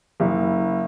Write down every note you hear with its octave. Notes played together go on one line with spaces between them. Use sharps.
F#1